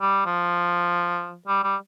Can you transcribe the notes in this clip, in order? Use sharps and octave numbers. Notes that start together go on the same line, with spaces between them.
G3
F3
G3
G3